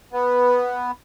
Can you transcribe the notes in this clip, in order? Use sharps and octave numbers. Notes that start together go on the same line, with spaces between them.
B3